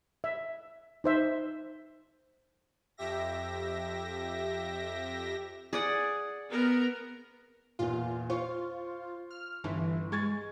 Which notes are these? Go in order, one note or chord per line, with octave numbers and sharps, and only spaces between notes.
E5
D#4 C5 E5
F2 G4 E5 A#6
G#4 D5 F#5
B3 A#4
E2 A#2 F4
F4 C5 C#6
F6
G1 E3
G#3 C#6 G#6 A6